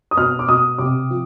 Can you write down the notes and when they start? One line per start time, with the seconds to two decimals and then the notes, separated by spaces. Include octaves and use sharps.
0.11 D#6
0.17 B2 F6
0.39 D6
0.49 B2 D#6
0.78 C3 D6
1.10 F3